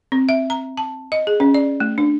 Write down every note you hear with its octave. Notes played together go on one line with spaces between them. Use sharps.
C4
E5
A#5
A5
D#5
G#4
C#4
D5
A3
D4